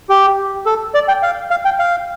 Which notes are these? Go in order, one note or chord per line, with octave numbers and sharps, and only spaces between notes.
G4
A4
D5
G5
F5
F5
G5
F5